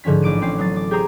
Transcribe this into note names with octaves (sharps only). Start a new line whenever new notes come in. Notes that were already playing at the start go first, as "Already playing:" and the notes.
G#2 D3 F3 C#4 B6
A1 D6 D7 D#7
C4 C#4 D6 C7
F#3 D#6 A6
D6
G4 G#4 C5 A#5 D#6